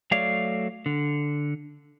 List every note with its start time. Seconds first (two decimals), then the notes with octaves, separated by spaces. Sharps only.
0.11 F#3 A3 C#5 D5 F5
0.86 D3